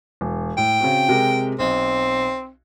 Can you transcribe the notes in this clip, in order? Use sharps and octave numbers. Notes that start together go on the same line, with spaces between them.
E1
A2 G5
C#3 C4 F#4
C3 G#3 A#4
B1 C4